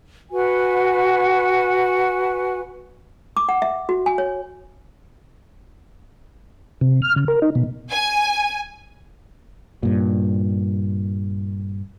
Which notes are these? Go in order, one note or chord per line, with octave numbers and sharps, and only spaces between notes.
F#4 B4 G#5
D6
F#5
E5
F#4
G#5
C#5
C3
F6
C#3
A#4
D#4
B2
G#5
G2 A#2